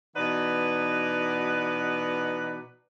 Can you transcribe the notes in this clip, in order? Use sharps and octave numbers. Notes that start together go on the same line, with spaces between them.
B2 E3 D#4 B4 D5 F#5